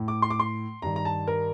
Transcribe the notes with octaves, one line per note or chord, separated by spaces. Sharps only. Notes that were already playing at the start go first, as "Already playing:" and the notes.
Already playing: A2
D6
C6
D6
C6
G2 D#3 A#5
A#5
A5
A#4